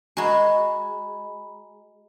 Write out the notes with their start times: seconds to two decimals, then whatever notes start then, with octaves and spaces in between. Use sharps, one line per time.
0.17 G#3 F#4 G#5 A#5 B5